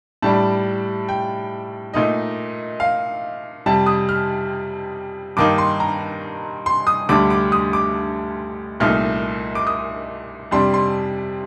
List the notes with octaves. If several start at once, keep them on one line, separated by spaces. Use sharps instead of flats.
A2 G3 D4 A5
G5
A#2 A3 D#4 D#5
F5
F2 C3 G3 A5
D#6
F6
G2 D#3 A#3 D#4 D6
C6
A#5
C6
D#6
D2 D3 G3 D6
D6
D#6
D6
C2 A#2 A3 D#4 F6
D6
D#6
F2 C3 G3 D4 C6
C6